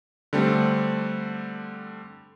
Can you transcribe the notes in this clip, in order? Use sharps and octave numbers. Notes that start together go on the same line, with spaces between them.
D3 G3 A3 C4